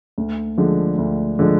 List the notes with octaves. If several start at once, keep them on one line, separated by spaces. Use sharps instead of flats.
D2
D3 F3 G#3 D4
D2
D3 F3 G#3 D4